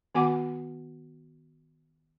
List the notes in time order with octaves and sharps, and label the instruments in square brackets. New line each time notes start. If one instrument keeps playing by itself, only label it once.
[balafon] D#3 B3 F#4 F#5 G#5 D6